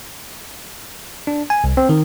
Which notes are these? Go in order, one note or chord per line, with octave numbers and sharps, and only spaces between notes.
D4
G#5
C2
C4
D#3